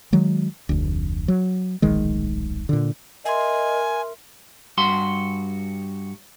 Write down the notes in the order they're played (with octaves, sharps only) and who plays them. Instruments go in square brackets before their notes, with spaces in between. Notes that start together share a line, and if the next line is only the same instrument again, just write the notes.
[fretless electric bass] D#3 F#3 G#3
F1 D2
F#3
D1 A#1 D#3 G#3
A#2 D3
[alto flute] A#4 [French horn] D#5 [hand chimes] E5 C6 [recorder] G#5
[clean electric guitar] G2 F#4 C6